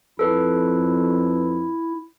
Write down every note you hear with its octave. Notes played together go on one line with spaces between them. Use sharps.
F2 E4 A4 B4